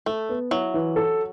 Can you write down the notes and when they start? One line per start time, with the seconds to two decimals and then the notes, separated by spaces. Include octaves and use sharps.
0.06 A3 A4
0.29 B3
0.51 F#3 E4
0.74 E3
0.96 A4